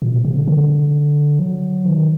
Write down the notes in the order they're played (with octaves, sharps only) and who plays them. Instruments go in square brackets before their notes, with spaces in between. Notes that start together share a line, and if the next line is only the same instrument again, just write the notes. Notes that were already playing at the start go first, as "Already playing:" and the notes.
[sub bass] A#2
C3
C3
D3
D3
F#3
D#3